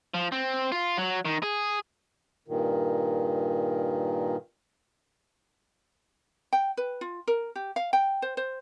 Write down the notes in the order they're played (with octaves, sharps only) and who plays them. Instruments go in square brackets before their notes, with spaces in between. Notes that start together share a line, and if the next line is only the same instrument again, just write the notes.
[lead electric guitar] F3
C4
F4
F#3
D#3
G#4
[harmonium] G2 A#2 D#3
[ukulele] G5
B4
F4
A#4
G4
F5
G5
C5
C5